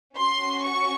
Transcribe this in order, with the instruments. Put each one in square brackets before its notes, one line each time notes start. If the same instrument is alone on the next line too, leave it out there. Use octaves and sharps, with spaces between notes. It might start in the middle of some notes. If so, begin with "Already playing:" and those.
[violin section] C#4 F#4 C6
C#6